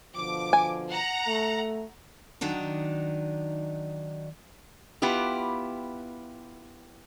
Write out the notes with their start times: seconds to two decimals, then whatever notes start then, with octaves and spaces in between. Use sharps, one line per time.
0.16 B2 D3 F3 D6
0.53 G#5
0.89 F#5 A#5
1.27 A3
2.41 D#3 F#3 D4 D#4
5.02 B3 E4 F4 G4